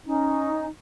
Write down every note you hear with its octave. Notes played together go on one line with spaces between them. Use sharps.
C#4 D#4